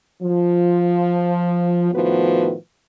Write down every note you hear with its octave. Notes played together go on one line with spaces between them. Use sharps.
F3
A2 D#3 F3 B3 F#4 B4